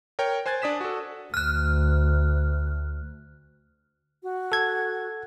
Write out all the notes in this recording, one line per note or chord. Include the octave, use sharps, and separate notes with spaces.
A#4 C#5 G5
C5 G#5 F#6 G#6 A6
D4 D5 D#6 B6 E7
F#4 A4
D2 F6 F#6
F#4
A4 G#6